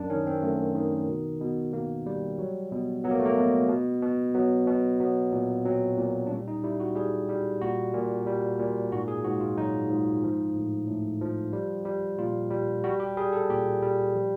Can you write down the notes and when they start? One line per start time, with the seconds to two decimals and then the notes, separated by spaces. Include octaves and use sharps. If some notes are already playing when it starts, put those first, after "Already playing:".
Already playing: F#2 D4
0.10 D#3 C#4
0.27 C4
0.42 F#2 A3
0.75 D#3
1.08 B2
1.41 B2
1.73 B2 A#3
2.06 G3
2.39 F#3
2.72 B2
3.04 F#3 B3
3.11 A#3
3.19 A3
3.26 A#3
3.37 B2
3.69 B2
4.02 B2
4.35 F#3 B3
4.67 B2
5.00 F#3 B3
5.32 A#2
5.65 F#3 C4
5.97 A#2
6.27 D4
6.30 G3 C#4
6.48 D#4
6.63 G3 E4
6.80 F#4
6.96 G3 G#4
7.29 G3
7.62 A#2 F#4
7.94 A#2
8.27 G3
8.59 A#2
8.92 G#2 F#4
9.08 G#4
9.24 G#2 F#4
9.40 F4
9.58 F#3 D#4
9.89 G#2
10.23 F3
10.56 A2
10.88 A2
11.21 F3
11.53 G3
11.86 G3
12.19 A#2 F4
12.51 G3
12.84 G3 F#4
13.00 G4
13.17 G3 G#4
13.33 A4
13.50 A#2 G4
13.82 G3
14.14 F3